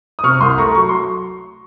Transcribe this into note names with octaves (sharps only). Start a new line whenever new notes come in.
D#6
C3 C#6 F6
C2 C6 D#6
A3 A#5 C#6
F#3 C#6
C6